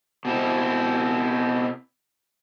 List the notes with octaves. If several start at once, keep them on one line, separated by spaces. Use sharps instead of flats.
B2 C4 E4